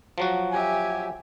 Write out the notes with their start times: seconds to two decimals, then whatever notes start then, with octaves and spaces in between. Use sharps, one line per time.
0.18 F3 F#3 F#4
0.51 G4 E5 G#5